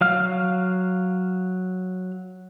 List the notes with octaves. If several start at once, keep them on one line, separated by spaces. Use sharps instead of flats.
F#3 F5 F6